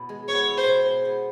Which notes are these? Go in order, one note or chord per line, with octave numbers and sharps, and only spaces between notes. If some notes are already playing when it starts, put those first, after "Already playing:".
Already playing: B2 E4
G#3
B3 C#5
E4
C5
B2
G#3
B3